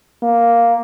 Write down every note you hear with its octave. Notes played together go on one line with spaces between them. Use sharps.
A#3